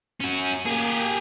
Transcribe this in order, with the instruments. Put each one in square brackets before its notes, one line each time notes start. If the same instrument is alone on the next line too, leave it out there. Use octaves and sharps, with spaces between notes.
[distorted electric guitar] C#4 F#4
[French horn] A#3 [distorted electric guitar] G4 G#4